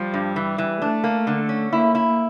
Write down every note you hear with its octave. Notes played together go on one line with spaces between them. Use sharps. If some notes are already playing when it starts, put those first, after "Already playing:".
Already playing: F3 G3
G2
E3
E3
A3 D4
A#3
D3
C#4
A#3 E4
E4